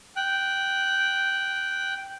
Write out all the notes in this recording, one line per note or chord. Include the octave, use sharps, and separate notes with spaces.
G5 F#6